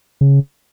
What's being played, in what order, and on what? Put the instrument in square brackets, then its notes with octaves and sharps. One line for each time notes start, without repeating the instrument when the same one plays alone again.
[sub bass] C#3